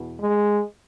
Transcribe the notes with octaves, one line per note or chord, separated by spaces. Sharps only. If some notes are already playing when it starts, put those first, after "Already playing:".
Already playing: E2 B2
G#3